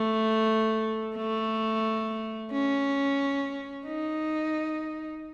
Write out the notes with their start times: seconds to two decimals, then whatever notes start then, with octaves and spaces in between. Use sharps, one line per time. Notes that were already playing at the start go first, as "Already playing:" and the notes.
Already playing: A3
1.16 A3
2.52 C#4
3.86 D#4